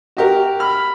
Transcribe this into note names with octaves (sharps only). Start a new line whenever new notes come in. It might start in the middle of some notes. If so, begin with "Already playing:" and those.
F#4 G4 A#4
B5 F6